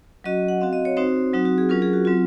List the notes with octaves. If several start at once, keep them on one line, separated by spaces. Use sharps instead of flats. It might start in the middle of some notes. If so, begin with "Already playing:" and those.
F#3 C#4 F#4 D#5
F#5
C4 F#4 F5
D#5
C#5
C4 D#4 F#4 C5
F#3 C4 D#4 F#4
F#4
G#4
F#3 C#4 F4 A#4
G#4
F#4
F#3 C4 F4